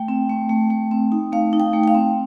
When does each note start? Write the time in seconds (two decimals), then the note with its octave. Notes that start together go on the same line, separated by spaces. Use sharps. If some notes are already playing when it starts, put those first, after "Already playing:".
Already playing: A3 G5
0.08 C4
0.30 A3
0.49 A3
0.70 A3
0.91 C4
1.12 D#4
1.32 A3 F5
1.53 D#4
1.60 G5
1.73 A3
1.84 G5
1.88 F5
1.95 C4